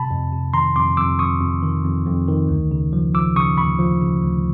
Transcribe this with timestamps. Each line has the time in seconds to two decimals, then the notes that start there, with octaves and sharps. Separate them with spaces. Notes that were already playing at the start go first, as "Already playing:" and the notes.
Already playing: C3 A5 B5
0.11 F2
0.33 C3
0.54 D#3 A#5 C6
0.76 F2 C6 D6
0.97 F2 D6 E6
1.19 F2 C#6 D#6
1.41 F2
1.62 D#3
1.84 F2
2.06 F2
2.28 D#3
2.49 D2
2.71 C#3
2.93 F3
3.14 F3 D6 E6
3.36 C#3 C#6 D#6
3.57 D2 B5 C#6
3.79 F3
4.01 C#3
4.23 D2